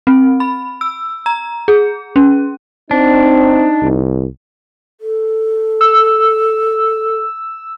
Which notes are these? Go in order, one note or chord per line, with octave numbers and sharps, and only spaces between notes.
C4
B5
E6
A#5
G#4
C#4
C4 D4 D#4
C2
A4
E6